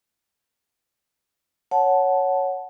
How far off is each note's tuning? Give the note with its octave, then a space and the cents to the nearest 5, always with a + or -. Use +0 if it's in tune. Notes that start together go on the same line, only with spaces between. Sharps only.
C#5 +0 F#5 +0 A5 -10